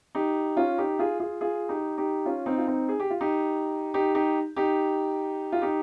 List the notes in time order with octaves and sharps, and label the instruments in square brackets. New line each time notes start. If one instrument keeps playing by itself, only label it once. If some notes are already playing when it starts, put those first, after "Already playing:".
[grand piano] D#4 G4
C#4 F4
D#4 G4
F4 G#4
F4 G#4
F4 G#4
D#4 G4
D#4 G4
C#4 F4
C4 D#4
F4
C4 D#4
G#4
G4
F4
D#4 G4
D#4 G4
D#4 G4
D#4 G4
F4
D#4 G4